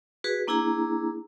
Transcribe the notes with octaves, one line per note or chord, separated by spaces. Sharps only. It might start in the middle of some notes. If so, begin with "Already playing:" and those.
F#4 G#4 B4
A#3 D4 E4 G#4 A#5